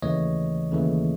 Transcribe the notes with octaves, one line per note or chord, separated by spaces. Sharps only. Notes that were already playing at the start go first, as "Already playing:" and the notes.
D#2 C#3 E3 A3 C#5 D#5
D#2 C#3 E3 A3